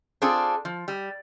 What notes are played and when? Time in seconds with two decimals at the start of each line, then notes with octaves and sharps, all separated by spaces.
0.22 C4 D4 F4 G#4 A4
0.65 F3
0.88 G3